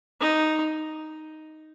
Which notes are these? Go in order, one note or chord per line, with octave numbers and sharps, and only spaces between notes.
D#4